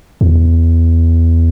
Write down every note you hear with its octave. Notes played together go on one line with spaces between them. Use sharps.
E2